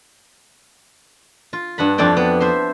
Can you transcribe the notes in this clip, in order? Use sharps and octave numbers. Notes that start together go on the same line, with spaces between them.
F4
G2 D4 F#5 B5
F2 D4 E4 D5 G5
B3
C5 E5 C6